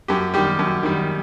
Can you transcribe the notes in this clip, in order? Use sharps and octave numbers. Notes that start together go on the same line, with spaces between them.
F#2 G4
D#3 G3 G4
F#2
D#3 G3